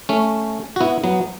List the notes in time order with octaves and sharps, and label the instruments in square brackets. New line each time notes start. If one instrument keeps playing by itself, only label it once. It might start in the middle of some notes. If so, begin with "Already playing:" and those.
[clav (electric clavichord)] A3 C#4
F#4
B3 E4
F#3 B3